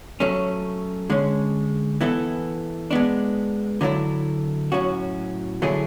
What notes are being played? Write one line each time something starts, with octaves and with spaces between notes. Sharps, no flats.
F#3 A3 C#4
D3 G#3 C#4
E3 B3 E4 A4
G#3 B3 D4
D3 F#3 A3 E4
A2 F#3 C#4 F#4
D3 F#3 A3 E4 G#4